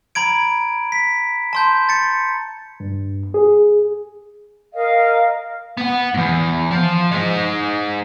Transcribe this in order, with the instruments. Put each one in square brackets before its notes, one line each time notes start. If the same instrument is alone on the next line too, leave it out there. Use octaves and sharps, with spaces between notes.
[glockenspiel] A#5 B5 G#6 D7
B6
A5 C6 G6
A6 C#7
[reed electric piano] G2
G#4
[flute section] A#4 D#5 F5
[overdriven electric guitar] B3 F#5
E2 G#2
F3
G#3 D#4